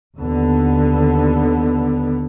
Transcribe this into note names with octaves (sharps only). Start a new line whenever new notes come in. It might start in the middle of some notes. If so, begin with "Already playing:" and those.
D#2 D3 B3